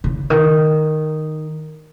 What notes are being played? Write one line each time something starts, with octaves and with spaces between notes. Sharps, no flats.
C#3
D#3